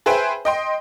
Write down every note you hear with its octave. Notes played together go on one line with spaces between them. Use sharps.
G#4 B4 C5 E5 G5 G#5
D#5 G5 C6